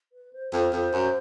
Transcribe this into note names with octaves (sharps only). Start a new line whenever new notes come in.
B4
C5
F2 C5
F2 C5
F#2